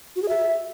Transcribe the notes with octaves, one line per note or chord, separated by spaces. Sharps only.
F#4
G#4
E5